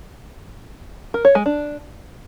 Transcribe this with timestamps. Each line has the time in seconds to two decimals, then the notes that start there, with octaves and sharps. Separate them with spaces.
1.14 A#4
1.25 C#5
1.35 G#3
1.46 D4